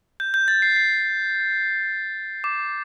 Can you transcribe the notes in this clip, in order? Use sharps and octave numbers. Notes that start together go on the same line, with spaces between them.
G6
G6
A6
C7
C7
D6